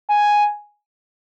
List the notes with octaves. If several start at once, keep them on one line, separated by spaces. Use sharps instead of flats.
G#5